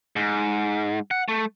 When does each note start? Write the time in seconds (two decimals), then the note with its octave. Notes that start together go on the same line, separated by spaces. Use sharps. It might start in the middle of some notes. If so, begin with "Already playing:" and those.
0.16 G#2
1.11 F#5
1.28 A3